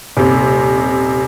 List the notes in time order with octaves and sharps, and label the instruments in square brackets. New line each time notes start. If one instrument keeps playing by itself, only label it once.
[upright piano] D#1 C3